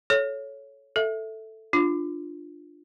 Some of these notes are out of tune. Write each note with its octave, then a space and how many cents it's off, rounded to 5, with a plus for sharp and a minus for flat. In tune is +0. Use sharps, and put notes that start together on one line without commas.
A4 -20 C#5 +0
A4 +5 E5 -10
D4 +15 F4 +0